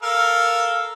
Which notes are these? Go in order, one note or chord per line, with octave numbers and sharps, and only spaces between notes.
A4 A#4 F5